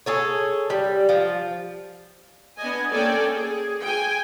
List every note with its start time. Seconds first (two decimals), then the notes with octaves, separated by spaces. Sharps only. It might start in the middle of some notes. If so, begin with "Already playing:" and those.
0.06 G#4 A4 C#5
0.70 G3
1.09 F3
2.58 B3 D4 D#5 G#5
2.92 A#3 C#4 A4 D5 G5 G#5
3.34 G#4
3.82 G5 G#5